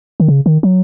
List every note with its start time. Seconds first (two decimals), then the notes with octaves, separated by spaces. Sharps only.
0.20 D#3
0.28 C#3
0.46 D#3
0.63 F#3